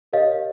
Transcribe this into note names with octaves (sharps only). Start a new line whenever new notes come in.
G4 A#4 C#5 D#5 F5